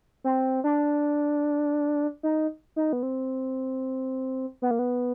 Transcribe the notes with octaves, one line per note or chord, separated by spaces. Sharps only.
C4
D4
D#4
D#4
B3
C4
B3
A#3
B3